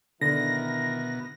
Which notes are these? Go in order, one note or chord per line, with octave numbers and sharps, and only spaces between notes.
B2 D3 D#3 E4 A#4 A#6